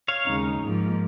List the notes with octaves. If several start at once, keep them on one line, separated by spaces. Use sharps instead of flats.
C#5 F5
D#2 C#3 G#3 D#4
G#2 F3 A#3